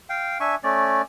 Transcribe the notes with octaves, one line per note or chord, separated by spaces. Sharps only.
F5 G5
D4 E5 G#5 C#6
A3 C#4 D5